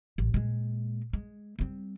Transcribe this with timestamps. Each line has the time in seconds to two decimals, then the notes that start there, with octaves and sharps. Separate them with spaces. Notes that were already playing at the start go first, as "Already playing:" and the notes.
0.18 A1
0.34 A#2 G#3
1.13 G#3
1.59 G3 C4